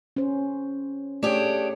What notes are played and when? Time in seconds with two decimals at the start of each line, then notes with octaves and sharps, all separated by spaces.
0.16 C#4 C5
1.23 A3 D4 G4 G#4 C#5